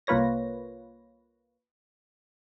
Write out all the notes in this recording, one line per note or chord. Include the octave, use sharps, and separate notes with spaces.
C2 A#3 F4 B4 C#5 A#6